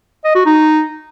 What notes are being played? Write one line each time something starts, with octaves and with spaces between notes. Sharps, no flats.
D#5
F#4
D#4